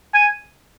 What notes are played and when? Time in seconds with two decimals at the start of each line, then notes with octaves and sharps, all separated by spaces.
0.14 G#5